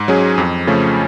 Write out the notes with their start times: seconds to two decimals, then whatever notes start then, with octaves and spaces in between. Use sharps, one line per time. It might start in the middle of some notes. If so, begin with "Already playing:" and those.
Already playing: G#2
0.08 F#3 C#4 G#4
0.38 F2
0.67 C#3 F3 A3 C#4